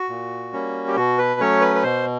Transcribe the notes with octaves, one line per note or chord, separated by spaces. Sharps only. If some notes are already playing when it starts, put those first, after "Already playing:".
Already playing: F#4
A#2
G3 A#3 C#4
G4
B2 F#4
B4
F#3 A3 C#4 C#5
B4
B4
B2 C5